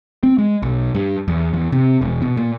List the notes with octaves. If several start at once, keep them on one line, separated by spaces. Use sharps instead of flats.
C4
G#3
B1
G2
E2
E2
C3
E1
B2
A#2